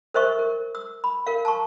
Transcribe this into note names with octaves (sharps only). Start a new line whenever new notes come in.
A#4 C5 E5 C#6
A#4
E6
B5
A#4 F5
A5 A#5 C#6